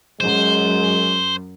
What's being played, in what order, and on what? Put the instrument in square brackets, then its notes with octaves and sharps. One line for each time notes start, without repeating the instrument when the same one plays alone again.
[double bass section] F#2 [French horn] G#3 [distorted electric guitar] C5